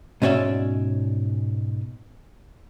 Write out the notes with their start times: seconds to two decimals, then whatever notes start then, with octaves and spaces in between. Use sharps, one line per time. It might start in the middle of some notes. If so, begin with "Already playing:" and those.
0.22 G#2 B2 C#4 C#5 D5 E5